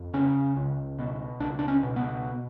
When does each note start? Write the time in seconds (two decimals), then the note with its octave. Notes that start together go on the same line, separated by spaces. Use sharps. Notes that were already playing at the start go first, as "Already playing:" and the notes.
Already playing: F2
0.13 C#3 C#4
0.56 C#2
0.99 B2
1.40 C#2 D4
1.59 D4
1.68 C#4
1.83 B2
1.96 B3